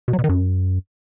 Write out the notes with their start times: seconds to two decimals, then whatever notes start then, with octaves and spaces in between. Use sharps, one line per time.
0.08 B2
0.13 F#3
0.19 B2
0.24 D#3
0.29 F#2